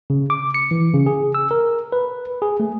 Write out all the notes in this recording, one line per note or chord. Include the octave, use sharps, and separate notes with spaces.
C#3
D6
C#7
E3
C#3
G#4
E6
A#4
B4
G#4
A3